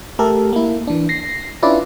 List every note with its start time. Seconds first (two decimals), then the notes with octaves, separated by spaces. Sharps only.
0.19 A3 G4 A4 A#4
0.53 A#3 E4
0.87 E3 D4
1.09 A#6 C7
1.62 C#4 D4 E4 F4 B4 D5